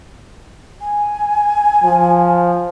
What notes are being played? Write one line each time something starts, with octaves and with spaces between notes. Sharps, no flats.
G#5
F3